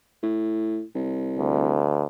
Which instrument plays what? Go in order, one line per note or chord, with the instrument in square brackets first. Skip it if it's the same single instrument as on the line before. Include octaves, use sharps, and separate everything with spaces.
[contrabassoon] A2
C2
[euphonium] D2